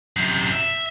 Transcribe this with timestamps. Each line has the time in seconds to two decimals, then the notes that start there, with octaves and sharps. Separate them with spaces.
0.16 F#2 C3
0.52 E5